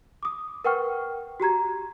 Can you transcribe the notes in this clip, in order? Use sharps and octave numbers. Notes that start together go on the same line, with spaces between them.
D6 D#6
A#4 B4 F#5 G5 C#6 F6
F#4 G4 A#5 G#6